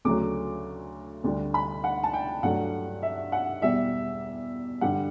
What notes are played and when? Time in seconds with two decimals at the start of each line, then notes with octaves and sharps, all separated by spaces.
0.05 D2 C#3 F#3 A3 D6
1.24 D2 D3 G3
1.54 B5
1.84 F#5
2.03 A5
2.13 G5
2.43 G2 F#3 A3 F#5
3.03 E5
3.32 F#5
3.62 E2 B2 G3 E5
4.81 G2 D3 G3 F#5